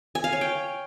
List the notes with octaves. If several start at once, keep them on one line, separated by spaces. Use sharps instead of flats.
G#5
F5
C#5
G5